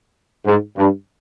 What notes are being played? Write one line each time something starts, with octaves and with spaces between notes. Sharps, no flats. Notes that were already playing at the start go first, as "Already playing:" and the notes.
G#2
G2